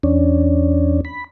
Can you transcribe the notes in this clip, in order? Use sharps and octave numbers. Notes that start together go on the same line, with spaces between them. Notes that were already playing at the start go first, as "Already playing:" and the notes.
E2 C#4 D4
B5